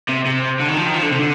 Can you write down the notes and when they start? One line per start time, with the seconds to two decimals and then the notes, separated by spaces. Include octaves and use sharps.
0.09 C3
0.26 C3
0.60 D3
0.69 D#3
0.77 F3
0.86 D#3
0.94 F3
1.02 D3
1.11 C3
1.19 D3